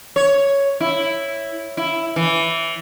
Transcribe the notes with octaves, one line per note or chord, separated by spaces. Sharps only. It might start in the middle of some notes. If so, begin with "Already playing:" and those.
C#5
E4
E4
E3